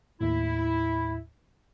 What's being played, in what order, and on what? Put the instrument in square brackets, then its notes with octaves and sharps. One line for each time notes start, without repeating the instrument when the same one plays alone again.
[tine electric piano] D#2 A2 [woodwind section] E4